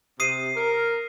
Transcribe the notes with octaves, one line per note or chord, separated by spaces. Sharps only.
C3 D#6 C7 D#7
A#4